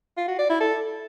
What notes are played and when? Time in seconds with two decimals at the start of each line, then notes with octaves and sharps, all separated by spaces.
0.17 F4
0.28 F#4
0.39 D5
0.49 E4
0.60 A4